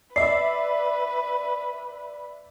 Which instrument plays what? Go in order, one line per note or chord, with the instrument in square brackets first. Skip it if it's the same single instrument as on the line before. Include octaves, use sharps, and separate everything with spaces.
[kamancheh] B4 [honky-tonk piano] D5 E5 [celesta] C7